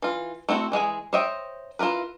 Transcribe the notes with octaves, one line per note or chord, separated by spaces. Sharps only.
E3 F4
A3 C4 E4 F#4
E3 G#3 G#4 G#5
C5 C#5 D#5 E5 G5
E4 F4 G#4 A#4 B4